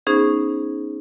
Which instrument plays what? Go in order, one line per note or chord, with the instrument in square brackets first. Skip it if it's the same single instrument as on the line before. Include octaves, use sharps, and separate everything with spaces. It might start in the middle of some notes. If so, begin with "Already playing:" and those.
[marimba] B3 C#4 D#4 G#4 C5